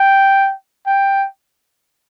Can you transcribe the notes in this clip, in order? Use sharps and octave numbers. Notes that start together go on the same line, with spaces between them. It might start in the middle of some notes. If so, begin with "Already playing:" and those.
Already playing: G5
G5